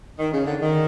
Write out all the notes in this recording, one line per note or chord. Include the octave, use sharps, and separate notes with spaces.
D#3
C#3
D3
D#3